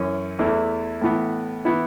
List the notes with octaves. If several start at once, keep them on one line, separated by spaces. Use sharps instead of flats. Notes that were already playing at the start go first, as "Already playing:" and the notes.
Already playing: F#2 E3 C#4
E2 E3 A3 E4
A2 E3 B3
E3 B3 E4